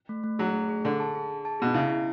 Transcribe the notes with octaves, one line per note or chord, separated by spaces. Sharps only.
A3
A3
F#3 G#4
A3
G#4
D3 G#4
A5
G#4
G#4
A5
B2 G#4
C#3 E4
E4